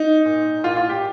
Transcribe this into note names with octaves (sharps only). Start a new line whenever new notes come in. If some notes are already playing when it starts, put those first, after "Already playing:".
Already playing: D#4
A#2
A#2 F4
F4
G4